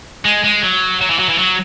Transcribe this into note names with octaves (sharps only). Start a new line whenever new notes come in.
G#3
G#3
F#3
F#3
E3
F#3
E3
F#3